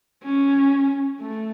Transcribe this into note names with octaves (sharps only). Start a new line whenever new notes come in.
C#4
A3